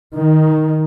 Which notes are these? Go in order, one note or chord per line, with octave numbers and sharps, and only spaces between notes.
D#3